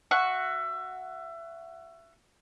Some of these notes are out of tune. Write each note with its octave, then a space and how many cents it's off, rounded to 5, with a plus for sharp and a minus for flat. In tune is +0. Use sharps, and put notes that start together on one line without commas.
F#4 +0 E5 +25 C#6 +0